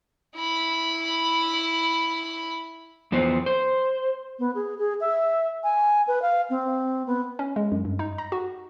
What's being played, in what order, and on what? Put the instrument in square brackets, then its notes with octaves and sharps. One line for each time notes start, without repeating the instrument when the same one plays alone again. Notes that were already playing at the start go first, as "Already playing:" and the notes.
[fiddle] E4 B5
[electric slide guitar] E2 F3 B3 C5
C5
[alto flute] B3
G#4
G#4
E5
G#5
B4
F5
C4
B3
[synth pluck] C#4
G#3
F#2
G2
D#4
A#5
F#4